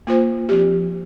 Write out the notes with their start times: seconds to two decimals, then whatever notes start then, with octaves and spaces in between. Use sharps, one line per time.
0.07 A#3 F4 C5
0.49 F3 C4 G4